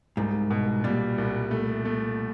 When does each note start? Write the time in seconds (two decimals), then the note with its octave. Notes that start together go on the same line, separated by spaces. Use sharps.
0.17 C2 G#2
0.51 B2
0.84 A#2 G3
1.18 C2
1.51 A3
1.85 A3